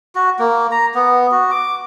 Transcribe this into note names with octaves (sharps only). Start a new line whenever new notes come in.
F#4
A#3
A#5
B3
F#4
D6